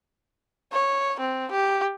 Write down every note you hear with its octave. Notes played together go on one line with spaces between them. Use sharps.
C#5
C4
G4